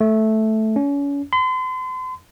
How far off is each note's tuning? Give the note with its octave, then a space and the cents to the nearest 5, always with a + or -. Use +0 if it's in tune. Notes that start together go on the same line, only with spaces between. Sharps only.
A3 -5
C#4 +35
C6 -40